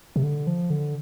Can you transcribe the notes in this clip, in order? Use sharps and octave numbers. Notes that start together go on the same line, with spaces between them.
C3
D3
F3
D3